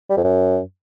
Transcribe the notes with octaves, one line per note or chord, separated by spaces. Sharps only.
G3
F2
F#2